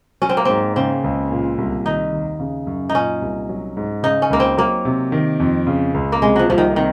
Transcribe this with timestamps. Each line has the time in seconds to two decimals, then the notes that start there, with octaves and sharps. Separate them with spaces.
0.22 F#3 C#4
0.29 C4
0.37 A#3
0.45 G#2 C4
0.76 C#3 C4
1.04 C#2
1.30 A#2
1.58 C2
1.85 D#3 D#4
2.12 D#2
2.40 C#3
2.67 F#2
2.89 D#4
2.95 A#2 C#4
3.22 C2
3.49 F#3
3.77 G#2
4.03 C#3 D#4
4.22 C#4
4.30 C#2 A#3
4.40 C4
4.57 F#3 A#3
4.85 C3
5.12 D#3
5.40 F2
5.67 C#3
5.94 C#2
6.12 A#3
6.22 C3 G#3
6.36 F3 F#3
6.49 C2 F3
6.58 D#3
6.76 C3 D#3